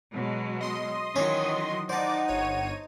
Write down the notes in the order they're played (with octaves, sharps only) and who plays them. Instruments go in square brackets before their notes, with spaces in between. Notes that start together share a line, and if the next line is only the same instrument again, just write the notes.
[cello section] B2 F#3 G#3
[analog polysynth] D#5 C6 D#6
[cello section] D#3 E3 F#3 [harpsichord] C#4 C#5
[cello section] D#4 [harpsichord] C5 A5 [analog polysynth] D5 D6 [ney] F#5
[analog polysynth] G1 C#5 D#7